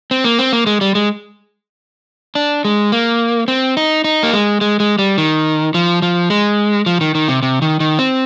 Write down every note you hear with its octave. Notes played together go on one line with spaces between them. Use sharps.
C4
A#3
C4
A#3
G#3
G3
G#3
D4
G#3
A#3
C4
D#4
D#4
A#3
G#3
G#3
G#3
G3
D#3
F3
F3
G#3
F3
D#3
D#3
C3
C3
D#3
D#3
C4